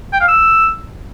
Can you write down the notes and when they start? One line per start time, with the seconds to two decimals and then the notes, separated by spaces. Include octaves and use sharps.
0.13 G5
0.20 F5
0.28 E6